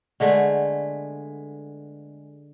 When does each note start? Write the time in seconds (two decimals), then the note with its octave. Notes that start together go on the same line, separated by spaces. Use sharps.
0.20 D3 G#3 A3 B3